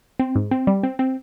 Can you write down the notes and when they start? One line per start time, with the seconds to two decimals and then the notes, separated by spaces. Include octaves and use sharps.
0.19 C4
0.36 G#2
0.51 C4
0.67 G3
0.83 C4
0.99 C4